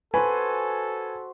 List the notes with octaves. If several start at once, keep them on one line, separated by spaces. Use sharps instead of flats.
F#4 A4 B4 C5 G#5